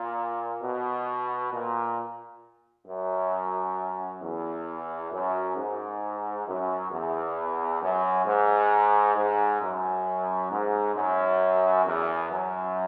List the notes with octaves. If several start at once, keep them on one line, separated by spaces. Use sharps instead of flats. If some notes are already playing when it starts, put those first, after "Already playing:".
Already playing: A#2
B2
A#2
F#2
E2
F#2
G#2
F#2
E2
F#2
G#2
G#2
F#2
G#2
F#2
E2
F#2